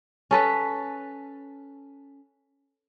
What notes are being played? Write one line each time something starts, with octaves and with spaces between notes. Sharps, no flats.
C#4 A4 B4